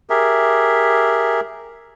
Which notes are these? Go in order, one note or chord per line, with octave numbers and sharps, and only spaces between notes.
G4 G#4 A#4 E5